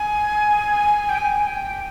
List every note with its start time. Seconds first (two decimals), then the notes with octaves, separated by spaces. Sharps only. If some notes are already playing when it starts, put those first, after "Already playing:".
Already playing: G#5
1.09 G5
1.18 G#5
1.47 G5